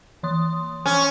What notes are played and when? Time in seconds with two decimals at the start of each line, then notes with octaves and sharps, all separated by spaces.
0.23 E3 C6 D#6
0.86 C#4